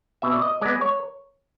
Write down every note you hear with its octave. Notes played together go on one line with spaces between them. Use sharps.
B2 E5
D5
D#5
G#3 B3 D5
C#5